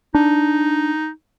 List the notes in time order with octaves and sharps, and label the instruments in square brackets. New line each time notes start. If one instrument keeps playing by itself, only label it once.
[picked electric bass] D4 [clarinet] D#4